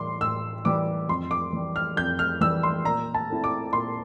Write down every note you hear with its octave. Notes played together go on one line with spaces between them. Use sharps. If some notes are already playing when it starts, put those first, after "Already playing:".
Already playing: A2 E3 G3 C6 D6
A2 E6
E3 G3 D6
F2 C6
D6
E3 G3
F6
F2 G6
F6
E3 G3 E6
C6
A#2 A#5
A5
A3 C4 E4
D6
A#2 C6